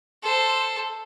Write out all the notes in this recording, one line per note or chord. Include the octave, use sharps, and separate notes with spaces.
A4 C5